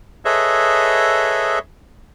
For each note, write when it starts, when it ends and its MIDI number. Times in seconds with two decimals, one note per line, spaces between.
0.25 1.59 68
0.25 1.59 69
0.25 1.59 71
0.25 1.59 73
0.25 1.59 75
0.25 1.59 76